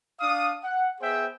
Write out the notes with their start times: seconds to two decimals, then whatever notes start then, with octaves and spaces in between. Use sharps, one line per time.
0.20 D4 F5 D#6
0.64 F#5
1.00 B3 G#4 C5 E5 G5